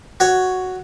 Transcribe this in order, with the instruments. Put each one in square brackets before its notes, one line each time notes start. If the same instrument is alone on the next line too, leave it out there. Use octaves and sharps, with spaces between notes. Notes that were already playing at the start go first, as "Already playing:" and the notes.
[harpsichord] F#4 C#5